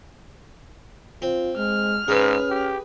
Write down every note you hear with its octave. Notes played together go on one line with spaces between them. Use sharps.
C4 F4
G#3 F6
G#2 C#4 G#4 B4
G4